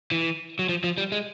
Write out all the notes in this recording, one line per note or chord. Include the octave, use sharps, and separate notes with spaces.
E3
F#3
F3
F3
G3
G#3